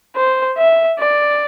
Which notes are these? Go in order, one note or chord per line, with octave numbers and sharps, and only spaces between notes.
C5
E5
D5